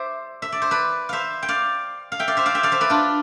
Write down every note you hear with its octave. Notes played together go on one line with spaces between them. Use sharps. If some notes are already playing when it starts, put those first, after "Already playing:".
Already playing: C5 D5 E5
E5
D5
C5
B4 D5
C5 E5 F5
G5
D5 F5
F5
E5 G5
D5 F5
C5 E5
D5 F5
E5 G5
D5 F5
C5 E5
B4 D5
D4 F4